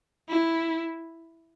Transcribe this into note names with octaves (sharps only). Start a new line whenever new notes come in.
E4